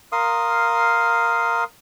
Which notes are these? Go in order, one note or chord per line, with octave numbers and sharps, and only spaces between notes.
A#4 F5 C6 D#6